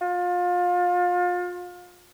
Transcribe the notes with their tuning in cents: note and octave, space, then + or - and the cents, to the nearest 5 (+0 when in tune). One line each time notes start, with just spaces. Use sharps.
F4 +30